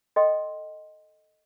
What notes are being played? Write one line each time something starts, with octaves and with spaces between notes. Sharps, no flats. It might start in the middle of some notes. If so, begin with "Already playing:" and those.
A4 D#5 G5 C6